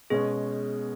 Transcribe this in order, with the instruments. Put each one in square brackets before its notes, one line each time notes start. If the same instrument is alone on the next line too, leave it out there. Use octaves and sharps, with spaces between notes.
[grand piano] B2 G#3 C#4 [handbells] G#4